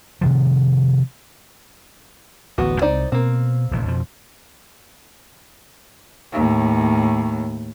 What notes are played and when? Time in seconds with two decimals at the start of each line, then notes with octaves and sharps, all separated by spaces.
0.21 C3 D#3 F3
2.58 D1 A1 B3 F#4
2.82 C2 G#3 C4 D#4 C5 D5
3.12 B2 A#3 C4
3.71 D#1 A1 C3
3.86 F2 B2 F3
6.33 D#2 A2